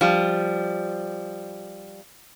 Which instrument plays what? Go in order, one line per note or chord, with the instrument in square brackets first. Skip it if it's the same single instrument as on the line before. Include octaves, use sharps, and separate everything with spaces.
[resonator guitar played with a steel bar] F3 G3